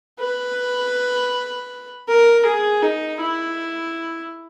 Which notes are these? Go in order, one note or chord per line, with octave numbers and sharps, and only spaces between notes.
B4
A#4
G#4
D#4
E4